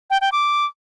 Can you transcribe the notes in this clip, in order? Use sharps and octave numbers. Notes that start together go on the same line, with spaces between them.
G5
G5
D6